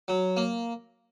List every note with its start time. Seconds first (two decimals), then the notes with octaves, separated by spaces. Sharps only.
0.08 F#3
0.37 A#3